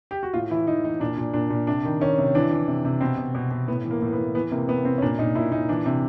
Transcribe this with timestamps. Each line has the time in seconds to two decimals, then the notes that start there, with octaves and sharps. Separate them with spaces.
0.11 G4
0.23 F#4
0.34 A2 F4
0.50 E3 E4
0.67 E3 D#4
0.83 E3 D#4
1.00 A#2 D4
1.18 A#2
1.34 A#2 D4
1.50 A#2
1.67 C3 D4
1.85 D#3
2.01 D#3 C#4
2.18 C3
2.35 E3 D4
2.51 E3
2.68 C3
2.85 C3
3.01 B2 C4
3.18 B2
3.35 B2
3.51 B2
3.68 A2 B3
3.84 E3
3.91 A#3
4.02 A2
4.13 B3
4.18 A2
4.35 E3 B3
4.51 C3 A#3
4.68 C3 B3
4.85 C3 C4
4.98 C#4
5.02 A#2 D4
5.18 A#2 D#4
5.35 A#2 E4
5.51 A#2 D#4
5.69 E3 D4
5.86 C3